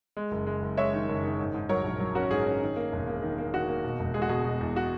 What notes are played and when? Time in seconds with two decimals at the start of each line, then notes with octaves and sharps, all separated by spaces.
0.17 G#3
0.31 F#1
0.47 G#3
0.62 F#1
0.77 G#3 C#5 E5
0.93 D#3
1.09 F#1
1.23 D#3
1.39 G#2
1.54 G#2
1.69 F#3 A#4 C#5
1.84 A#1
2.00 F#3
2.15 C#4 F#4 A#4
2.30 G#2 G#4
2.46 C#4
2.62 D#3
2.76 A#3
2.92 E1
3.07 A#3
3.23 D#3
3.38 A#3
3.54 D#3 F#4
3.69 A#3
3.84 B2
4.00 E1
4.14 G#3 G#4
4.22 F#4
4.29 B2 G#4
4.45 B2
4.60 E2
4.76 F#4